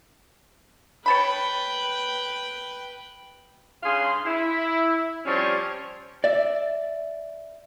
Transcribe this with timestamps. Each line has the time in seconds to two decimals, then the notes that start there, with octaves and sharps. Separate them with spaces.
1.06 B4 C#5 G5 A5 B5
3.83 G2 C#3 G#4 F5 C6
4.25 E4
5.25 F3 G3 C4 C#4 C#5 D5
6.24 D5 E5